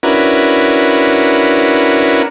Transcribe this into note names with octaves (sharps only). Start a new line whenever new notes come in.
C#4 D4 E4 F#4 A#4 B4